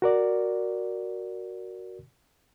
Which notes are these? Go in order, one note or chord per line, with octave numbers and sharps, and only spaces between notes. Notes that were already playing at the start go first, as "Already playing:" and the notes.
F#4 A#4 D5